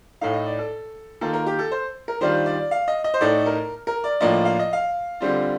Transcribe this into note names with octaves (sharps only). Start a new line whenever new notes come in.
A2 A3 D#4 F5
D#5
D5
A4
D#3 A#3 F4 A4
A#4
G4
A4
C5
A#4
D#3 G3 D4 F4 C5
D5
F5
D#5
D#5
C5
A2 A3 D#4 D5
A#4
A#4
D5
A2 F3 A#3 D4 F4 D#5
F5
D#5
F5
D3 G3 C4 F4